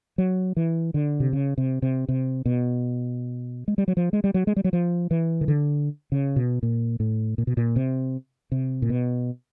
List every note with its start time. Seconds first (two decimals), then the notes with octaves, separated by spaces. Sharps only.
0.18 F#3
0.57 E3
0.94 D3
1.20 C3
1.33 C#3
1.58 C3
1.82 C3
2.09 C3
2.46 B2
3.68 G#3
3.78 G3
3.88 F#3
3.97 F3
4.13 G#3
4.24 G3
4.34 F#3
4.47 G#3
4.56 G3
4.64 F#3
4.73 F3
5.11 E3
5.41 D#3
5.48 D3
6.12 C#3
6.36 B2
6.63 A#2
7.00 A2
7.38 A#2
7.47 B2
7.57 A#2
7.76 C3
8.52 C3
8.82 A#2
8.90 B2